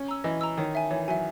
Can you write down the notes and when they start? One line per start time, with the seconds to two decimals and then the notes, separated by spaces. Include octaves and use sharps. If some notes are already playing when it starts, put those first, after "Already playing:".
Already playing: C#4
0.08 A#5 E6
0.24 E3 D#5
0.41 A#5 E6
0.58 D#3 C#5
0.75 E5 G#5
0.91 E3 C#5
1.08 F#3 E5 G#5